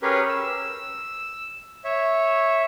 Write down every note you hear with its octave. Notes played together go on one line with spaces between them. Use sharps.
C#4 G4 G#4 A#4 B4 C#5
E6
C#5 E5